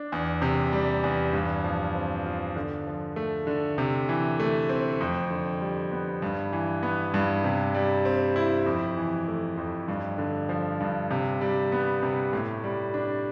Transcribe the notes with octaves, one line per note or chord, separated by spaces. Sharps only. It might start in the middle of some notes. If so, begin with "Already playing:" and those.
Already playing: D4
E2
C3
G3
E2
G2
F3
C4
F4
D3
F3
A3
D3
C3
E3
A3
C4
F2
D3
G3
B3
G2
E3
B3
G2
C3
G3
C4
E4
F2
E3
A3
F2
G2
D3
F3
G2
C3
G3
B3
C3
A2
G3
D4